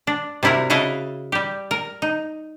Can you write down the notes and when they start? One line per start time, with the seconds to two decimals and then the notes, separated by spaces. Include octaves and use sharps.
0.07 D4
0.43 C3 G3 E4 F#4 A#4
0.70 C#3 E4 F#4 D#5 F5 A5
1.32 G3 G4
1.71 A#4
2.02 D#4